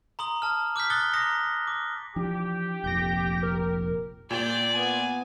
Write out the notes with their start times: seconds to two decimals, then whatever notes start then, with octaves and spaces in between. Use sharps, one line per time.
0.19 A#5 C6 D#6 F#7
0.42 A5 F6
0.76 D6 F6 G6 B6
0.90 D#6 F#6 A6 C#7 G7
1.13 A#5 D#6 A#6 C#7
1.67 D6
2.16 E3 F3 D4 G4
2.84 F1 A#1 F2 G6 A#6
3.43 A#4
4.31 A#2 D5 G5
4.74 B3 G#5